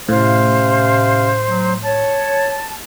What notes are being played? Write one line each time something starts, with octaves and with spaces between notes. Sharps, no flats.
A2 C3 C#4 C5 F5
F#3
C#5 A5